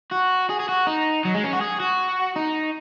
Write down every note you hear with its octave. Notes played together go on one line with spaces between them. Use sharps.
F#4
G#4
G#4
F#4
D#4
F#3
G#3
C#4
F#4
G#4
F#4
D#4